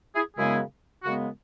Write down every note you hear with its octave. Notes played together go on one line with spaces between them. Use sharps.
E4 G#4
F#2 C#3 G#3 B3 E4 G#4
F#2 C#3 G#3 B3 F#4